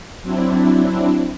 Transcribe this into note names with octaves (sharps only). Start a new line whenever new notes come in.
F#3 C4 D4 E4